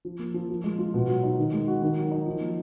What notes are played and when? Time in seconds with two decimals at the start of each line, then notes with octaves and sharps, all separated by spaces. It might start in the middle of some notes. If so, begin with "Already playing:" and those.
0.05 F3
0.19 A#3
0.34 F3
0.50 F3
0.64 G#3
0.79 F4
0.94 B2
1.08 F#3
1.23 D#4
1.38 D#3
1.53 G#3
1.67 F#4
1.82 D#3
1.97 F#3
2.11 D#4
2.26 F3
2.41 A#3